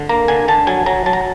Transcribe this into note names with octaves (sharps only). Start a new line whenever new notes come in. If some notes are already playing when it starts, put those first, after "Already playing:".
Already playing: D3
A#3 A#5
D3 G#5
D3 A5
F#3 G#5
F#3 A#5
F#3 A5
A#5